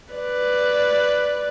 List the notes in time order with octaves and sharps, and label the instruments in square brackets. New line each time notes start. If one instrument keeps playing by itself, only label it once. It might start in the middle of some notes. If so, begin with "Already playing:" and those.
[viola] B4 D5